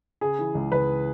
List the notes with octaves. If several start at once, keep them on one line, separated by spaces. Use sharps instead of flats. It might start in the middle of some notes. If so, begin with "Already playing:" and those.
C#3 G#4
E3
C#2
C#2 B4